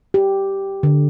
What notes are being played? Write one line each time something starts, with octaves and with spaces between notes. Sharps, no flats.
G4
D3